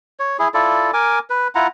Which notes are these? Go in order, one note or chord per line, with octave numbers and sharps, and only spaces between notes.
C#5
E4 G#4
E4 F4 A4 D5
A#4 G#5 D6
B4
E4 F4 F#5 A#5